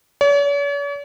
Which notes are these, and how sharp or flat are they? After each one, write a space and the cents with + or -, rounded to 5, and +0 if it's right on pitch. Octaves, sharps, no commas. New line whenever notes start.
C#5 +45